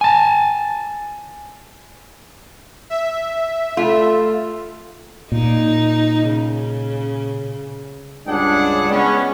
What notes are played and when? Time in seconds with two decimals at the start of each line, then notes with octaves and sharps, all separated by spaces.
0.01 G#5 A5
2.90 E5
3.77 A3 F4
5.32 A#2 D#4
6.29 C#3
8.27 C#2 G2 D4 G#4 F#5
8.90 G#3 B3 C#4